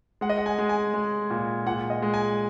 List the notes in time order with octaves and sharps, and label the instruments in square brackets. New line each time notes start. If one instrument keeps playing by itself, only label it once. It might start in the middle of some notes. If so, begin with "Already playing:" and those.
[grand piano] G#3 F#5
D#5
F#5
G#5
G#3
G#5
G#3
A#2
A#2 F#5
D#5
G#3
G#5